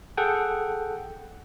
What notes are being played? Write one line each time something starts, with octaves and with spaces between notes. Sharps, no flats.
G#4 A4 F#5 G5